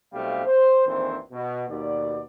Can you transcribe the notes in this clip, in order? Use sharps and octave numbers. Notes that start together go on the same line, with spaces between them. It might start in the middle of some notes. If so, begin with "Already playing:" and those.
B1 B2 G3 A3 C4 F5
C5
A#1 F2 D#3 E3 C4 C5
B2
D#2 B2 D5